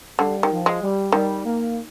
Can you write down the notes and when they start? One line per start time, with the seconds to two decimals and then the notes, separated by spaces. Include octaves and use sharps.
0.19 D3 G3
0.43 D#3
0.51 F3
0.66 G#3
0.82 G3
1.12 D#3 G3
1.44 A#3